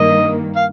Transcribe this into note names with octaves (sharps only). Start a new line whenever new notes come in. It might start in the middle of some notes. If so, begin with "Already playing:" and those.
Already playing: G2 D#3 A#3 D#5
F5